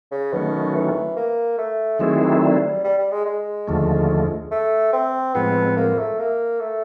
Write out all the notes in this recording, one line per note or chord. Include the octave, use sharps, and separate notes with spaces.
C#3
B2 D#3 F#3 A3 C#4
E3
A#3
A3
D#3 F#3 G#3 A3 C4 E4
G3
G3
G3
G#3
G#3
D#2 D3 F3 A3
A3
C4
A2 F3 G#3 B3 C4
A#3
A3
A#3
A3